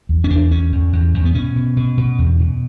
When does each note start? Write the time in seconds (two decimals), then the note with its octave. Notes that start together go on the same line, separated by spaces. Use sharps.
0.09 E2
0.24 C#4
0.30 E2 D4
0.51 E2 C#4
0.72 E2
0.93 E2
1.14 E2
1.25 B3
1.35 B2 C#4
1.56 B2
1.76 B2
1.97 B2
2.18 E2
2.39 B2